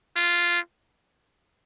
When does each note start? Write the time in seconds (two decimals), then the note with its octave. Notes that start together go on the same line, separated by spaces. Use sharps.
0.16 F4